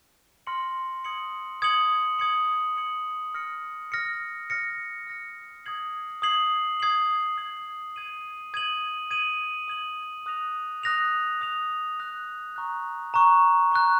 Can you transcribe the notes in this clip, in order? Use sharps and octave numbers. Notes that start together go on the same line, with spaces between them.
C6 F6 A#6 C#7 F#7
D#6 G#6 C#7 F#7
D#6 G#6 C#7 F#7
D#6 G#6 C#7 F#7
D#6 G#6 C#7 F#7
F6 A#6 C#7
F6 A#6 C#7
F6 A#6 C#7
F6 A#6 C#7
D#6 G#6 C7 F#7
D#6 G#6 C7 F#7
D#6 G#6 C7 F#7
D#6 G#6 C7 F#7
D#6 G#6 D#7 F#7
D#6 G#6 D#7 F#7
D#6 G#6 D#7 F#7
D#6 G#6 D#7 F#7
D#6 F#6 A#6 F7
D#6 F#6 A#6 F7
D#6 F#6 A#6 F7
D#6 F#6 A#6 F7
A#5 C#6 F#6
A#5 C#6 F#6
A#5 C#6 F#6